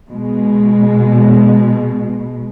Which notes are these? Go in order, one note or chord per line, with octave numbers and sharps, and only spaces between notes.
B2 G#3